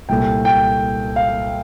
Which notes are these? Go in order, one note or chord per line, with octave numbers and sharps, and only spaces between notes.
C2 A#2 A3 G5
G5
F5